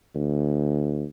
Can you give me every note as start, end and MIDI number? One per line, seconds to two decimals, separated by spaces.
0.15 1.05 38